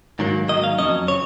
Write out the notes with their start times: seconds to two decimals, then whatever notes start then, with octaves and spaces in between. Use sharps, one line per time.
0.19 G#2 D#3 F#3 A#3
0.48 G#2 D#3 F#3 A#3 D#5
0.64 F5
0.79 F2 C#3 F#3 C#4 D#5
1.08 C#3 C#5